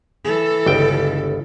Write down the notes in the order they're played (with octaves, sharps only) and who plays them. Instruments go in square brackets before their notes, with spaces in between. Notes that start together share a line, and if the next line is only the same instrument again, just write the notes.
[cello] E3 A4
[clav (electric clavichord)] G1 C#2 G5